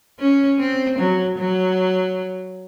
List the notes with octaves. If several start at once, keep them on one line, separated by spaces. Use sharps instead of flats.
C#4
C4
F#3
F#3